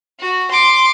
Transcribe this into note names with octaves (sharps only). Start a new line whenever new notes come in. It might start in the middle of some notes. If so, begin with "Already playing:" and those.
F#4
C6 D6